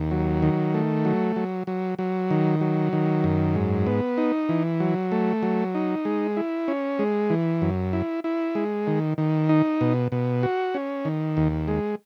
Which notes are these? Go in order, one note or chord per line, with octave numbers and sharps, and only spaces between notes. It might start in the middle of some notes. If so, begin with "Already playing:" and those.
Already playing: D#2
F#3
D#3
A3
F#3
F#3
F#3
F#3
D#3
F#3
D#3
F#2
G#2
B3
D#4
E3
F#3
A3
F#3
D#4
G#3
E4
C#4
G#3
E3
F#2
E4
E4
G#3
D#3
D#3
D#4
B2
B2
F#4
C#4
D#3
D#2
G#3